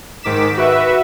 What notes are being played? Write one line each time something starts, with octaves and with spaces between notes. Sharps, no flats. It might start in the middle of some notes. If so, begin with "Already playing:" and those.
G#2 D#3 D6 B6 E7
F#4 B4 E5